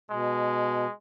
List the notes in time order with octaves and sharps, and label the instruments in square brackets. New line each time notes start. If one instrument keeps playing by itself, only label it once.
[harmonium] B2 [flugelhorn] G#3